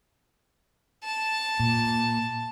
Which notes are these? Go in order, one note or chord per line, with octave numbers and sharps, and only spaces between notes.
A5
A#2